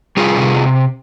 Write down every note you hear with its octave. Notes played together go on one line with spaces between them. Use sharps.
G3 F4 G#4
C3